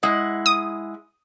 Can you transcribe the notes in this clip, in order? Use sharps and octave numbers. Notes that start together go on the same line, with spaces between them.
G#3 E4 F#5
D#6